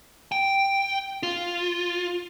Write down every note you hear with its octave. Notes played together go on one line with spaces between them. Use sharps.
G5
F4